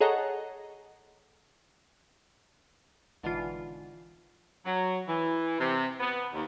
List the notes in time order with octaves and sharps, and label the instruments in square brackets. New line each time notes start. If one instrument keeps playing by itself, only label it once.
[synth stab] G#4 A4 C#5 D#5 F#5 A#5
[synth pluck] G#1 B2 D3 E3 F4
[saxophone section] F#3
E3
C3
B3
D#2